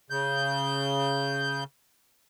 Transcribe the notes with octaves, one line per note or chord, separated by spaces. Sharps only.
C#3 G6